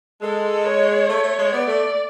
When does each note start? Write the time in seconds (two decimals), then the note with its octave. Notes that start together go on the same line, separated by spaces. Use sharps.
0.21 G#3 A4
0.65 C#5
1.09 A3
1.23 A3
1.38 G#3
1.53 B3 D5
1.67 A3